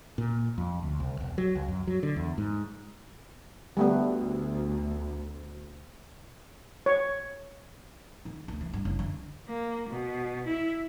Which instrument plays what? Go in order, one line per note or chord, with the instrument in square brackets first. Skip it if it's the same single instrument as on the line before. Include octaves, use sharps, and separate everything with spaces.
[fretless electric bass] A#2
F2
D2
C2
E1
F#3
C#2
F#2
F#3
D3
E2
G#2
[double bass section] D2 [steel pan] G3 A3 B3
[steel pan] C#5
[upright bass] D#3
D2
E3
G2
F#1
D3
[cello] A#3
B2
E4